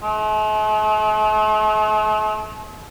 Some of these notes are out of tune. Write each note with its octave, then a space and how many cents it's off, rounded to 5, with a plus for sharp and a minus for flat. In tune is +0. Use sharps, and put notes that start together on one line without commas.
A3 -45